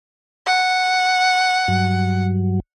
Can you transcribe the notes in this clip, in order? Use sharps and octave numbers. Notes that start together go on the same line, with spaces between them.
F#5
G2 F#3